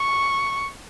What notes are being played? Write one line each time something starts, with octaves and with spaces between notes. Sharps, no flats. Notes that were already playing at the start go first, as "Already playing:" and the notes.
Already playing: C#6